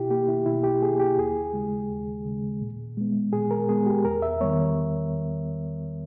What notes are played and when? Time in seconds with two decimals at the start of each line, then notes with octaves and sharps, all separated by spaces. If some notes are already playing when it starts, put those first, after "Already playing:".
Already playing: B2 E4 G4
0.10 A#3 G4
0.29 E4
0.46 B2 E4
0.64 G4
0.82 A#3 G#4
1.00 G4
1.17 D#2 G#4
1.54 C#3 G#3
1.90 D#2
2.25 C#3 G#3
2.62 A#2
2.97 G#3 B3
3.33 A#2 G#4
3.51 A#4
3.69 G#3 B3 G#4
3.86 G4
4.05 E2 A#4
4.22 E5
4.40 D#3 G3 B3 C#5